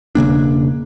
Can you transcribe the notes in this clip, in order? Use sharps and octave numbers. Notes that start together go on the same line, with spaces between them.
E1 C#3 A#3 D4